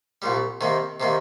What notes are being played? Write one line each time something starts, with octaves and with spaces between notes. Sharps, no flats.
C2 A#2 G3
C3 D#3 A#3
C3 D#3 A#3